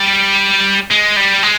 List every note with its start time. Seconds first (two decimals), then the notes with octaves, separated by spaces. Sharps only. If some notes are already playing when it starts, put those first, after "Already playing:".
Already playing: G3
0.91 G#3
1.16 G3
1.43 G#3